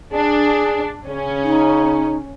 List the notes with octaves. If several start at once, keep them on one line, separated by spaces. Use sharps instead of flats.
D4 G#4
C#3 C#4
D#4